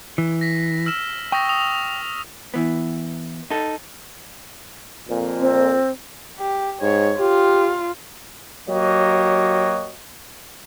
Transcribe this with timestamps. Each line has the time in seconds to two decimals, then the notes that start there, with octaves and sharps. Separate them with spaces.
0.18 E3
0.41 A#6 B6
0.86 E6 F6 E7
1.32 G5 C#6 D#6 A#6
1.49 D#6 F7
2.54 E3 B3
3.50 D#4 A4
5.08 F2 A#2
5.40 C4
6.39 G4
6.82 G#2 C#5
7.20 F4 G4
8.69 F#3 A#3 F#4 G4 C#5 D#5